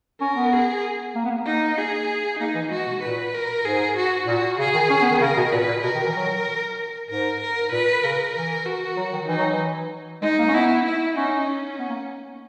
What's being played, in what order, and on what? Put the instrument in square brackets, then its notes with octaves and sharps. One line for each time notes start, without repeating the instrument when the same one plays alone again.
[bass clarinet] C#4 [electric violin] A#4
[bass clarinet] B3
[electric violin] G#4
[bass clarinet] A#3
B3
A#3
[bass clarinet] A#3 [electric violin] D#4
[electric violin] G#4
[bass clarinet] A#3 [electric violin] D#4
[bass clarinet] E3
[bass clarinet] G#3 [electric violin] F#4
[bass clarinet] B2
[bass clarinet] A#2 [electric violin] B4
[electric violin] A#4
[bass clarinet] G#2 [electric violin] G#4
[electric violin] F#4
[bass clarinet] A#2 [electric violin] F#4
[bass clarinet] C#3 [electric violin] G#4
[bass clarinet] D#3
C#4
B3
D#3
[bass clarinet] C#3 [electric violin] A#4
[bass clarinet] B2
[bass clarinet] A#2 [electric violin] B4
[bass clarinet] A#2
[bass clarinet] B2 [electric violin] A#4
[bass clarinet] D#3
E3
F#3
[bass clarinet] G#2 [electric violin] A#4
[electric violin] A#4
[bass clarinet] A#2 [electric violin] B4
[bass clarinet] C#3 [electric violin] A#4
[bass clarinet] E3 [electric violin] A#4
[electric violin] F#4
[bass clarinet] F#3
D#3
[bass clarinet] E3 [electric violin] D#4
[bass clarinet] F#3
E3
[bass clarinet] G#3 [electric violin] D#4
[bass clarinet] A#3
C#4
[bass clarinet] B3 [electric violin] E4
[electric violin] E4
[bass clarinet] C#4 [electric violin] D#4
[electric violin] C#4
[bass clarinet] B3
A#3